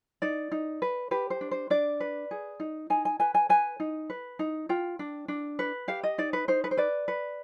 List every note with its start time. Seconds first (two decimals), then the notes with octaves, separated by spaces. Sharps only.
0.22 D#4 D5
0.51 D#4
0.82 B4
1.11 G4 B4
1.30 C5
1.41 D4
1.51 C5
1.70 D4 D5
2.00 B4
2.31 G#4
2.60 D#4
2.90 D#4 G#5
3.05 G#5
3.20 B4 G#5
3.34 G#5
3.49 B4 G#5
3.80 D#4
4.10 B4
4.39 D#4
4.69 F4 G5
4.99 D4
5.28 D4
5.59 B4
5.88 G4 F5
6.03 D#5
6.18 D#4 D5
6.33 B4
6.48 D#4 C5
6.64 B4
6.71 C5
6.77 B4 D5
7.08 B4